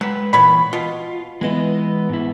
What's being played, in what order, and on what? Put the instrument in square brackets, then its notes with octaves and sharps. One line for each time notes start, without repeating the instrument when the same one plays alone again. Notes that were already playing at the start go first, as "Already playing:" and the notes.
[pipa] F#3 [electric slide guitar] G#3 B4
[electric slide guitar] A#2 E3 [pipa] B3 C#5 B5
[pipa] B2 [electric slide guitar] F4
[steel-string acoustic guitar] E3 B3 E4 [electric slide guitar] G#3 D#5
[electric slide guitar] G#2 E4